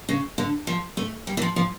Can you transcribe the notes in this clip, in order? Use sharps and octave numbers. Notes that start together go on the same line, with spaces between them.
C#3
D3
F3
A3
G3
E3
F3
F3